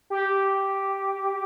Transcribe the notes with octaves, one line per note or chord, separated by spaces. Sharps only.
G4